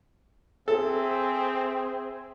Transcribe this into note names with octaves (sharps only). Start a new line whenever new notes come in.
C4 G#4 A4 E5